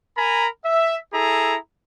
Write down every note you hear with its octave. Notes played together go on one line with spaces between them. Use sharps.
A#4 G#5 A#5 B5
E5
E4 G#4 A4 A#5